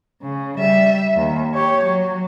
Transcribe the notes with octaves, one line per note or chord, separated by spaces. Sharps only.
C#3
G3 E5
D#2
G4 C#5
F#3